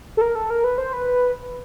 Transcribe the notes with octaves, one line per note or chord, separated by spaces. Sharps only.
A4
A#4
A4
A#4
B4
C5
B4